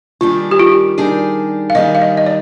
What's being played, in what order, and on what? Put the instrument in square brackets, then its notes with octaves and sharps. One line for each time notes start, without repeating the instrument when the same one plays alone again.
[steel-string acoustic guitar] D#3 G3 D4 G#4 [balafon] F4
[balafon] G4
F4
[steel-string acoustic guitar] D#3 G3 D4 G#4
[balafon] F5
[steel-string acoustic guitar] D#3 G3 D4 G#4 [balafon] D#5
[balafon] F5
D#5
D#5
D5